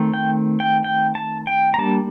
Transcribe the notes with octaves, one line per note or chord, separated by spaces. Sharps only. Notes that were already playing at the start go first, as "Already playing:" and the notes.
Already playing: D#3 A3 C4
G5
G5
G5
A5
G5
A#5
G3 A#3 D4 A5